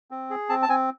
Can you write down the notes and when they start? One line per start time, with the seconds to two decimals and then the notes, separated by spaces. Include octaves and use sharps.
0.11 C4
0.30 G#4
0.49 C4 A5
0.62 A5
0.69 C4 G#5